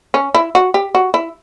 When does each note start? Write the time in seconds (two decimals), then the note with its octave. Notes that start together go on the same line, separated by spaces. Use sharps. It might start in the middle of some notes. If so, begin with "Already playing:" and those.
0.14 C#4
0.35 E4
0.55 F#4
0.74 G4
0.95 F#4
1.14 E4